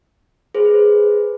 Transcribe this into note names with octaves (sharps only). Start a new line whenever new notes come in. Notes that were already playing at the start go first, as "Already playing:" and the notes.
G#4 B4 C5